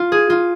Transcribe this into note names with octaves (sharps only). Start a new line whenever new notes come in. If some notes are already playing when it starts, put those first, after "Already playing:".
Already playing: F4
G#4
F4